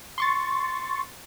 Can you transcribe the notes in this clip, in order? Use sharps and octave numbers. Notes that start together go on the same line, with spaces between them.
C6 C#6 A6